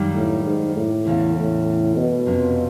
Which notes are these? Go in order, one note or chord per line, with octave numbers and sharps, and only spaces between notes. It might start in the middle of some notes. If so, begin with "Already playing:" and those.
Already playing: F#2 D#3 G3 A#3
A2
G#2
A2
E2 C#3 E3
A2
B2
F2 C3 F3 A#3 C#4